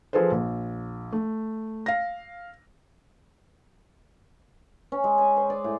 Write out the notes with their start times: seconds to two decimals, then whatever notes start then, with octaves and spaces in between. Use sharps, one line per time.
0.13 F3 G#4 A4 B4 C5
0.31 A#1
1.12 A3
1.86 F5 A#6
4.92 C#4
5.04 G#3
5.18 G#5
5.37 C5
5.50 D5
5.64 A2